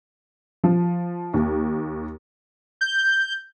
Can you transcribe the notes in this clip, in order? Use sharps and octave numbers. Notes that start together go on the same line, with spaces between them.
F3
D#2
G6